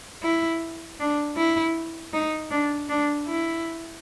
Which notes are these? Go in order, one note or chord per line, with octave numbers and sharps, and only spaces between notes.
E4
D4
E4
D#4
D4
D4
E4